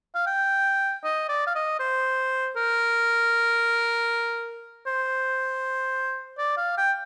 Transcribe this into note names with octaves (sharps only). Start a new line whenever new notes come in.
F5
G5
D#5
D5
F5
D#5
C5
A#4
C5
D5
F5
G5